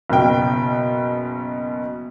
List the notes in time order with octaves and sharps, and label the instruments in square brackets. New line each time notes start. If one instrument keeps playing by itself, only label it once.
[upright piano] F#1 B2 G5